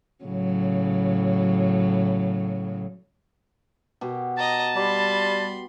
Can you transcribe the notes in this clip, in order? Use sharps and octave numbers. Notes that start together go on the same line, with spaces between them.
A2 C#3 F#3
B2 G4
D#5 A5 A#5
G3 B5 C6